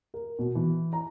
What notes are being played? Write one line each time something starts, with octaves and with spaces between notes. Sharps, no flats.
A#4
B2
E3
A#5